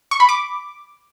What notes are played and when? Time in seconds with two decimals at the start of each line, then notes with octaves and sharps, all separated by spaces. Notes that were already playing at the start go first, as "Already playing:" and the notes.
0.11 C#6
0.20 B5
0.29 D6